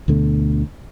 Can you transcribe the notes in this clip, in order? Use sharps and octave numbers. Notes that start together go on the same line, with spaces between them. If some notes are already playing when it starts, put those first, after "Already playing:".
D2 B2 D3 A3